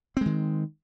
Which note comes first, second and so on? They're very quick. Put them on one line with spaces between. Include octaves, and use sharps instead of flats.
C4 G#3 D#3